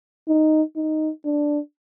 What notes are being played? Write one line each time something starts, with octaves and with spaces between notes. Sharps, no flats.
D#4
D#4
D4